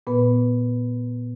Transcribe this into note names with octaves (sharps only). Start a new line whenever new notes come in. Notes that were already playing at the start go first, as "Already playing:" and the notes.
A#2 B3 B4